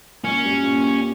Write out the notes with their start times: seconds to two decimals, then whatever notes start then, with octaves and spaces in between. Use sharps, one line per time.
0.24 A#2 A#3 C#4
0.43 G2 G3
0.63 A#2 A#3
0.82 G3 G4